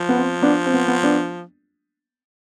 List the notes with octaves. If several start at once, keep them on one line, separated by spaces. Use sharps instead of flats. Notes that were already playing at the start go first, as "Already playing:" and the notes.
Already playing: F3
B3
C4
B3 D4
C4
B3
B3
B3 D4